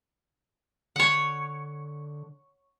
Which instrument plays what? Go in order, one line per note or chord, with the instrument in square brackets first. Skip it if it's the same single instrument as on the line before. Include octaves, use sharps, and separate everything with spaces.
[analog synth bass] D3 [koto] C#5 F#5